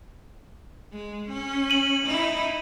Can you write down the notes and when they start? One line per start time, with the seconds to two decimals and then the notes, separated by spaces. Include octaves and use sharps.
0.92 G#3
1.29 C#4
1.70 D#7 F#7
2.06 D#4 E4